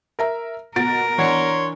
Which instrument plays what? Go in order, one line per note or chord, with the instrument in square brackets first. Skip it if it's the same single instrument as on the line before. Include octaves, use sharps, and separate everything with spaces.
[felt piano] A#4 E5 A#5
[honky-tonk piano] B2 F#4 A6 [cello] A#4 [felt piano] D7
[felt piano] E3 D4 F#5 [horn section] C#5 C6